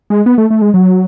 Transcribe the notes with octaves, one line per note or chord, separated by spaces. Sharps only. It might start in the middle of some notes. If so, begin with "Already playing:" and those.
G#3
B3
A3
A3
G#3
F#3